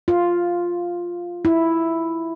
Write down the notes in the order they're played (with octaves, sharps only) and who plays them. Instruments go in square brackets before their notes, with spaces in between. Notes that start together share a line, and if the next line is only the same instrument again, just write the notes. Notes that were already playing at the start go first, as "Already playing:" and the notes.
[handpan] F4
E4